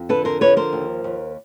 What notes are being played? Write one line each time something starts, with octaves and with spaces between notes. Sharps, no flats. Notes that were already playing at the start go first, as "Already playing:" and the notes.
Already playing: F2
D3 A4 B4
A#4 C5
F3 B4 C#5
A#4 C5
D#2
D#2